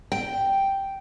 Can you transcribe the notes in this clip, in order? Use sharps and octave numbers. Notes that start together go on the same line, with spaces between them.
G5